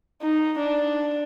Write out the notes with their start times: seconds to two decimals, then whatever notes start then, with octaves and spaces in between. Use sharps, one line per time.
0.22 D#4
0.59 D4